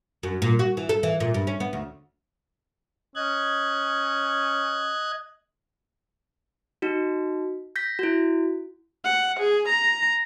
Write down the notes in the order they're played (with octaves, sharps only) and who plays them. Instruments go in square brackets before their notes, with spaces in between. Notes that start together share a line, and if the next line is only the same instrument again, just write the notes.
[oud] F#2
A#2
F#4
E3
A4
E3
A#2
G2
C#4
B3
D2
[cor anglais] C#4 [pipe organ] D#5 F#6 G#6
[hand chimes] D#4 F#4
G6 A#6 B6
E4 F#4
[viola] F#5
G#4
A#5